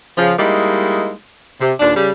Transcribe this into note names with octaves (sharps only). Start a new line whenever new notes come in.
C#3 F3
G3 G#3 A#3 D#4 E4
C3
D#2 A#2 D4
C#3 G3